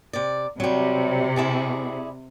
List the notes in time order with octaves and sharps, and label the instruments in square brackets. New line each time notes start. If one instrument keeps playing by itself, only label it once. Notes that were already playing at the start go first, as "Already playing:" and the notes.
[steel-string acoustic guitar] C3 D5
[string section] C3 [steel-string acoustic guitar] F#3 G3
[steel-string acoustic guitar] E4 G#4 D5